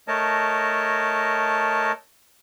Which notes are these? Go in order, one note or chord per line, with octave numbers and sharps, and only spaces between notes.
A3 A#4 C#5 D#5 A5